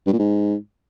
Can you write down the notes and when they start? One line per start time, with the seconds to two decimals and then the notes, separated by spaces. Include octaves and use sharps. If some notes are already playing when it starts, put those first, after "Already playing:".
0.07 G2
0.13 A#2
0.19 G#2